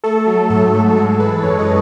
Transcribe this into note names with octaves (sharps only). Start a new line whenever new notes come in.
A3 A4
F#3
G#2 A4
G#2 A4
G#3 A4
E3 B4
F#2 C#5
D#5